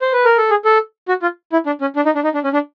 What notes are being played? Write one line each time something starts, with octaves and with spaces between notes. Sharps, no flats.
C5
B4
A#4
A4
G#4
A4
F#4
F4
E4
D4
C#4
D4
D#4
D4
D#4
D4
C#4
D4